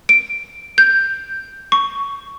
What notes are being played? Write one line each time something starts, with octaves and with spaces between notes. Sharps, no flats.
D7
G6
C#6